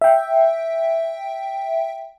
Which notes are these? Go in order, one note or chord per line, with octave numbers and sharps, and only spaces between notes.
E5 G5